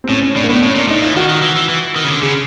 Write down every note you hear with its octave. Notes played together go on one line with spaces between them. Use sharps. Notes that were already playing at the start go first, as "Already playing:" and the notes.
C4
A2 C#4
C#4
A2 D4
A#3
A2 B3
A2 C#4
A#2 D4
A2 D#4
E3 F4
D#3 F#4
D#3
E3
E3
E3
D#3
C#3
D3
C#3 G#4